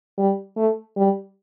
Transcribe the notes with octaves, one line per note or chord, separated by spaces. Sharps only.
G3
A3
G3